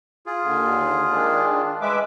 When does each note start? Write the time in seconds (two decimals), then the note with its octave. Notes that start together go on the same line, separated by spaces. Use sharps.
0.26 F4 G#4
0.43 D#2 D3
1.11 D#3 G#3 D4
1.82 G#3 B4 E5 D6